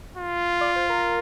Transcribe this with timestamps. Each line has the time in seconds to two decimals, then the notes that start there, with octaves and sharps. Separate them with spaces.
0.18 F4
0.61 D5
0.76 C5
0.90 A#4